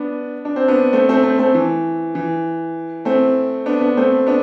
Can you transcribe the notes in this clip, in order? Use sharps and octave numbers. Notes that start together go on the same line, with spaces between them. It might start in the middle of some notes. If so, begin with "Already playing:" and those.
Already playing: B3 D4
D4
C4
B3 D4
A3 C4
A3 C4
A3 C4
A3 C4
E3
E3
A3 C4
B3 D4
B3 D4
A3 C4
B3 D4